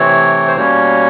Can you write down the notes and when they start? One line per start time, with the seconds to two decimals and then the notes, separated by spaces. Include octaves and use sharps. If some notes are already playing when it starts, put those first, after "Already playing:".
Already playing: C3 E3 A3 C4 C#5
0.47 C5
0.56 B2 G3 A#3 C#4 C#5